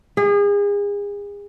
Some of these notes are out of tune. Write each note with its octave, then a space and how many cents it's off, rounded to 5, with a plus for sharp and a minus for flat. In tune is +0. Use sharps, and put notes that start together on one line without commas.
G#4 -35